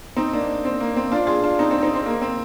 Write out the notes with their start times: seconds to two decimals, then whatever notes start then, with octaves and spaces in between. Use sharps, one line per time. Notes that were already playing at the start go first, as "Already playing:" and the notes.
0.17 C4 D#4
0.32 A#3 D4
0.65 C4
0.80 A#3
0.97 C4
1.12 D4 F4
1.27 F4 G#4
1.43 D4 F4
1.59 C4 D#4
1.71 C4 D#4
1.83 C4 D#4
1.94 C4
2.06 A#3
2.22 C4